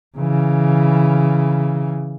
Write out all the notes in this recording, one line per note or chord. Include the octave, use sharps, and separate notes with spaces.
C#3 E3